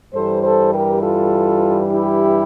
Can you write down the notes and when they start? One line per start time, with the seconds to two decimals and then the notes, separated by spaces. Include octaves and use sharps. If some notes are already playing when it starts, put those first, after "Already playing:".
0.13 G2 E3 G3 A4 C5
0.43 A4 C5
0.72 G4 A#4
1.02 F4 A4
1.90 E4 G4